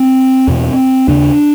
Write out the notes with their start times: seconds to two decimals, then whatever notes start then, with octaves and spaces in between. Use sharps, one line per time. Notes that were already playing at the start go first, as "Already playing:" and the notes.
Already playing: C4
0.48 E2 B2
1.08 D#2 C#3 D4